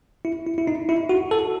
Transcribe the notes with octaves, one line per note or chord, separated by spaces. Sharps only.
E4
E4
E4
D#4
E4
F#4
A4